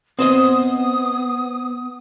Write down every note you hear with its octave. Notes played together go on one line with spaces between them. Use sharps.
B3 C4 C5 D#5 D#6